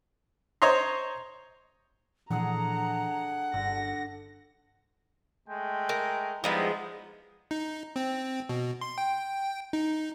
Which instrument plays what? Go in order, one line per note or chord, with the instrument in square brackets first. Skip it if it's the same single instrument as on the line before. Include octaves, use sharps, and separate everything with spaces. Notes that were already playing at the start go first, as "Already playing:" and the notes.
[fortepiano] C5 C#5 D#5 A#5 C6
[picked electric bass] A#2 E3 F3 [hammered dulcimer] D3 G#4 [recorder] F#5 [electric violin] A#5
[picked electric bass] G1 [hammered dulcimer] D3 [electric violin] A#6
[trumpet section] G#3 A3 G5
[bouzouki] A#4
[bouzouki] F3 G#3 B3 [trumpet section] G3 D#4 E4
[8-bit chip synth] D#4
C4
B2
C6
G5
D#4